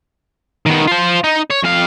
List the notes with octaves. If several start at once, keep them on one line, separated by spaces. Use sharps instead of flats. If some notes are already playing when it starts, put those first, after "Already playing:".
D#3 B3
F4 C5
D#4
C#5
F2 F5